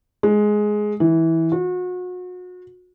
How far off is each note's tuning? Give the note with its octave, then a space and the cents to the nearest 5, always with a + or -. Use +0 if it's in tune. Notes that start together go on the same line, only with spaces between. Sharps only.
G#3 +10
E3 -15
F#4 -35